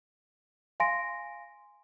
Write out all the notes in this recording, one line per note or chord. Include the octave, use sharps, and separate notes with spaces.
F5 G#5 C6 A#6 D7